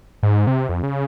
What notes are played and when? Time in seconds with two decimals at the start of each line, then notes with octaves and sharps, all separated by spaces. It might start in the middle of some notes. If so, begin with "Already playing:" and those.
0.23 G#2
0.47 C3
0.69 F2
0.83 C#3